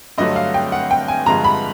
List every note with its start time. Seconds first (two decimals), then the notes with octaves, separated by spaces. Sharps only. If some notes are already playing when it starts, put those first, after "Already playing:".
0.18 G2 D3 F#3 A3 D#5
0.36 F5
0.54 G5
0.72 F#5
0.91 G5
1.08 G#5
1.26 G2 D3 F3 G#3 A#5
1.44 B5